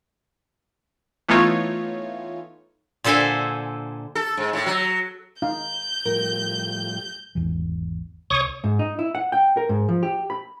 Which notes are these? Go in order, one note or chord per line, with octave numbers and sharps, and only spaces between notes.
E3 A3 B3 D#4 F4 C#5
A#2 D3 A4 C5 E5 G#5
A4
G#2
A2
F#3
D#4 F5 G6
A2 F3 G3 A#4
G#1 E2 E3
C2 C#5 C#6 D#6
G#2
D#4
E4
F#5
G5
A#4
G#2
F3
G4
B5